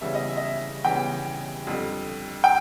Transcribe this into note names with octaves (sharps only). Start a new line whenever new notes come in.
C#3 E3 G3 B3 E5
D#5
E5
D#5
E5
C#3 E3 G3 B3 G5
F2 D3 G3
G5